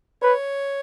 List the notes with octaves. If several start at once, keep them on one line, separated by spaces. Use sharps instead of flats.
B4 C#5